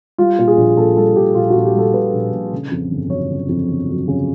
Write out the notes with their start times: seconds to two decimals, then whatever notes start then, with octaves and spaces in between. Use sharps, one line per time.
0.18 G3 F4
0.39 A#2
0.48 G#4
0.57 A#1
0.77 A#1 A4
0.96 G3 A4
1.16 A#2 G4
1.35 A#1 F4
1.50 F#4
1.55 A#1
1.65 G4
1.74 G3 A4
1.94 A#2 B4
2.13 A#1
2.32 A#1
2.52 C#3
2.71 F2
2.91 G1
3.10 F#3 C#5
3.30 C#3
3.49 F2
3.69 G1
3.88 F#3
4.08 C#3